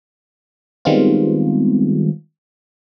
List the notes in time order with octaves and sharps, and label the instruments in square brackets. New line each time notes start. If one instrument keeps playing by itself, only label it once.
[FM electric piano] D#3 G3 G#3 B3 C4 F4